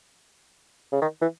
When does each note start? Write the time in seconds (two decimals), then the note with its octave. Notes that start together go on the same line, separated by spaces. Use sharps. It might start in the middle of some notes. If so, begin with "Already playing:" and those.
0.92 C#3
1.02 D#3
1.22 E3